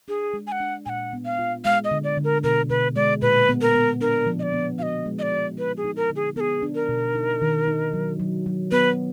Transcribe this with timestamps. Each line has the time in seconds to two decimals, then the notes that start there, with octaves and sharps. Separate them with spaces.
0.08 D4 G#4
0.34 G#3
0.47 G#5
0.52 F#5
0.60 D4
0.86 A#2 F#5 G#5
1.13 B3
1.25 F5
1.39 F4
1.65 G#3 F5
1.84 D#5
1.91 D3
2.04 D5
2.17 D3
2.24 A#4
2.44 B2 A#4
2.69 B2 B4
2.96 G#3 D5
3.22 A#2 B4
3.49 B3
3.61 A#4
3.75 B3
4.01 D4 A#4
4.26 F3
4.39 D#5
4.43 D5
4.53 B3
4.79 F#4 D#5 F5
5.06 G#3
5.19 D#5
5.22 D5
5.31 F#4
5.57 D#4 B4
5.77 G#4
5.84 D#4
5.96 A#4
6.10 D3
6.16 G#4
6.36 B3 A#4
6.40 G#4
6.62 D4
6.75 A#4
6.89 B2
7.15 D#4
7.42 D#3
7.67 D#4
7.93 F#3
8.20 F#3
8.46 F#3
8.71 B3 B4